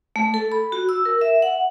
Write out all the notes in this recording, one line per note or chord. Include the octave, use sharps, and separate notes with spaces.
A3
A4
B5
F#4
E6
A#4
E5
F#5